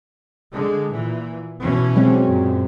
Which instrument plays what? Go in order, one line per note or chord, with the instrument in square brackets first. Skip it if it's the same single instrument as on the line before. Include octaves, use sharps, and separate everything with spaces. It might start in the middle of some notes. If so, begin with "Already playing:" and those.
[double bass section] D3 G#3
A#2 E3
B2 E3 C#4
[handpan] F#3 G#3 C4
[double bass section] F#2 A#2